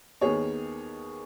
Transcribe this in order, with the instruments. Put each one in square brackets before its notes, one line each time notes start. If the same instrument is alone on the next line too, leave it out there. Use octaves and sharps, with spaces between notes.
[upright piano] D#2 D#3 B3 G#4 C#5